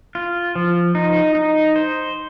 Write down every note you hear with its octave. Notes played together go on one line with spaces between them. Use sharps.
F4
F3
D#4
D#4
C5